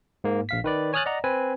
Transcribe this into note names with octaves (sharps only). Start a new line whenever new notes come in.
G#2 A#3
A#1 F5 B6
D#3 B4 D5
C#5 G#5 D#6 F6 F#6 A6
D5 D#5 F#5 A#5
C4 B4 G#5